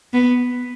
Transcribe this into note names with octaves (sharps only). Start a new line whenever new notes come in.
B3